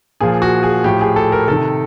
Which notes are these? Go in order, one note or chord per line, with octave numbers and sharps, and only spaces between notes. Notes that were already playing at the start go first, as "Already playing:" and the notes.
A#2 F3 G#4
F#4
G#4
A2 F3 G4
G#4
A4
A#4
C3 D#3 A4